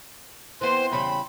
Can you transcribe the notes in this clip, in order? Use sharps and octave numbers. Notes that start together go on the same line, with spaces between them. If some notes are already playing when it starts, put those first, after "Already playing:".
E3 B3 C4 C5 C6
E2 C#3 G3 B5